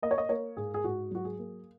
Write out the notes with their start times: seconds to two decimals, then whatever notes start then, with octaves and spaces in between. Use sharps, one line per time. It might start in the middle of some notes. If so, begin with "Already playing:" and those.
0.02 A#3 D#5
0.11 C#5
0.18 D#5
0.29 A#3 C#5
0.57 G#2 G#4
0.74 G#4
0.84 G#2 F#4
1.11 F#3 F#4
1.25 G#4
1.38 A#3